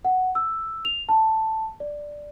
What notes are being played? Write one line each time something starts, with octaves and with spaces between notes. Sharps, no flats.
F#5
E6
F7
A5
D5